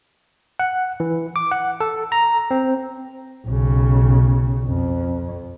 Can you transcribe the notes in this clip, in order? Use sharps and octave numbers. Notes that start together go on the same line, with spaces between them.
F#5
E3
D6
F#5
A4
A#5
C4
B1 C#3
F2